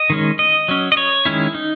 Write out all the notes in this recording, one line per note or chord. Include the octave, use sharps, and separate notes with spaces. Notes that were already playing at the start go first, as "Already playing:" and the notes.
Already playing: D#5
D#3 G#3 C#4
D#5
F#3 C#4
D#5
C#5
D#3 G#3 C#4 E4
D#4